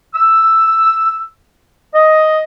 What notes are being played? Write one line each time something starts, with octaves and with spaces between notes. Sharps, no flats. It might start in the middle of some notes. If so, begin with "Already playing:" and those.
E6
D#5